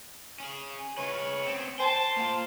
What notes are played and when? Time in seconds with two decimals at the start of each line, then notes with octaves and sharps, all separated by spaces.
0.40 C#4 G#4
0.98 C#3 B4 C#5
1.45 B3 C4
1.80 C5 G5 A5
2.17 A#3 F4